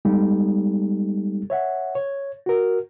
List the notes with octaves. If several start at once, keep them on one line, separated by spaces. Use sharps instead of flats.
G3 G#3 B3 D#4 G4 A4
C#5 E5 F#5
C#5
F#4 A#4